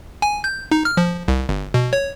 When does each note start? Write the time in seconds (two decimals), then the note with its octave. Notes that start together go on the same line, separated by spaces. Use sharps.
0.22 G#5
0.44 G6
0.71 D#4
0.85 F6
0.97 F3
1.28 C2
1.49 G1
1.74 B2
1.93 C#5